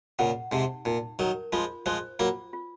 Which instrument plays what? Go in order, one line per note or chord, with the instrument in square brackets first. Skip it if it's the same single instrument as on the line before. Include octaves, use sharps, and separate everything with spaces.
[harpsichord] A#2 C#3 [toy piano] F#5
[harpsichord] G#2 C3 [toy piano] D#4
[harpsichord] A#2 [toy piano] D#4
[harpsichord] D#3 F#3 [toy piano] A#4
[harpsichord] F3 G#3 [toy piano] F4
[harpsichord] F3 G#3 [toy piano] C5
[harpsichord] F#3 A#3 [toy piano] F4
[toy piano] F4